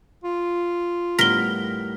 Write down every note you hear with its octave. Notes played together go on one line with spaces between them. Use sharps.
F4
A2 G3 B3 A#4 B6 G7